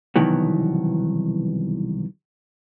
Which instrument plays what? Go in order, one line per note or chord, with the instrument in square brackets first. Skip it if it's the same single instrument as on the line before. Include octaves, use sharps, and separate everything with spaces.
[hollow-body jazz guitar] C2 B2 D#3 E3 F#3 B3